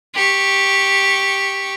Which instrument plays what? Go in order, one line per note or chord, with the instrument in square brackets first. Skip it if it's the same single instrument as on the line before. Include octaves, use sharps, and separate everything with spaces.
[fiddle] G4 C#6